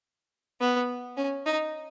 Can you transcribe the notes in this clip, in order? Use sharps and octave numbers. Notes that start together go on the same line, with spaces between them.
B3
C#4
D#4